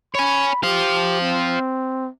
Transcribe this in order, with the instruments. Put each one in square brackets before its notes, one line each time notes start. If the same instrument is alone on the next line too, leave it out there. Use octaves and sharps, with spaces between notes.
[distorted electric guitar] C#5 G#5 [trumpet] B5
[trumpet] G4 [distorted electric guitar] C5 F5
[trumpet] C4